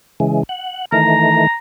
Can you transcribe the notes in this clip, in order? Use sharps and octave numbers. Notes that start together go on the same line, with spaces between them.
C#3 E3 G#3
F#5
D#3 E3 A3 A#5